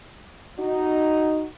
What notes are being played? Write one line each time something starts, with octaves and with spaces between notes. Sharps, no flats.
D#4 F#4